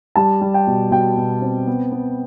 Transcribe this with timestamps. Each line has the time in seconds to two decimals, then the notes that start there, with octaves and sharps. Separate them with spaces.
0.16 G3 A5
0.41 G3
0.54 G5
0.67 B2
0.91 B2 G5
1.17 B2
1.41 C4
1.67 B3
1.92 B3